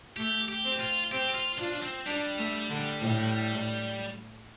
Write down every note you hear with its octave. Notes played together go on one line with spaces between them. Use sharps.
A3 G4
G4
C4
F4
C4 G4
F4
D4 F4
C4
G3 D4
A3
D3
A2